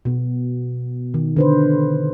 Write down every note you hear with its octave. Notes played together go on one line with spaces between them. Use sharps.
B2 B3
D#3
D3 B4 C5